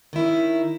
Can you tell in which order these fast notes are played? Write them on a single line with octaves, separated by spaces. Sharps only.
D#3 E4 C#4